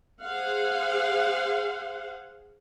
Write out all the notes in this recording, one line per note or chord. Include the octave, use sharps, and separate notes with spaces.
G#4 C5 F5 F#5